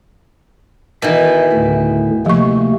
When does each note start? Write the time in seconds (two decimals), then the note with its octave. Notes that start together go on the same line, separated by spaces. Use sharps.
1.02 B2 D#3 E3 E5
1.53 D2 A2 D3
2.26 C3 F3 A3 A#3 C#6